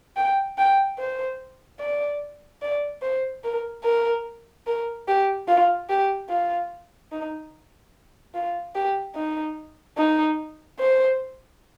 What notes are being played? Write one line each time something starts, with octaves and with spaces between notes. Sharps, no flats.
G5
G5
C5
D5
D5
C5
A#4
A#4
A#4
G4
F4
G4
F4
D#4
F4
G4
D#4
D#4
C5